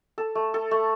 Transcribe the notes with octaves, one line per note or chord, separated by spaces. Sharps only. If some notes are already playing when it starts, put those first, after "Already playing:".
A4
A3
A4
A3